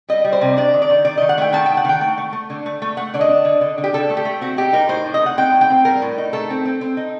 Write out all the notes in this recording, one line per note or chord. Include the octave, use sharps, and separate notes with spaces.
G3 D#5
G3
C5
C3
D4 D5
D#3
D5
D#3
D#3 D5
D#3 D#5
F#5
A3 G5
D#3 A5
D#3 G5
F#5
D#3 G5
A3
A3
A3
D3
A3
A3
A3 F#5
D3 D5
D#5
D4
D3
D3
D3
G4
D3 A4
A3
G4
A3
C4 F#4
D#4 G4
D#4 A#4
A2 C5
A2
D#5
D#4 F#5
C4 G5
A2
G5
C4
G3 A#4
A2
D#4
A3 A4
C4
C4
C4
D#4